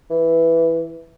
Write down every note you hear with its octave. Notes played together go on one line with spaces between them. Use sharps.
E3